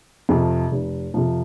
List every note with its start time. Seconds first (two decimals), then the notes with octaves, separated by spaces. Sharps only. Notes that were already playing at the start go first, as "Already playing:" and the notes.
0.29 F2 C3 F3
0.71 F1
1.14 F2 C3 F3